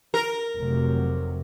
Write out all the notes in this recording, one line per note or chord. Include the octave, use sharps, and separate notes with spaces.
A#4
F1 C3 F#3